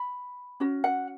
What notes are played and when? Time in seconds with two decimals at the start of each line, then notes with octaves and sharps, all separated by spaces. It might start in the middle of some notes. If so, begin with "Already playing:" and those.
Already playing: B5
0.60 C#4 F#4
0.84 F#5